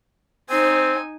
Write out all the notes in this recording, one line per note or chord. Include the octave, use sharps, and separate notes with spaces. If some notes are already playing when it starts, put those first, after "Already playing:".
C4 D#4 C5 G#5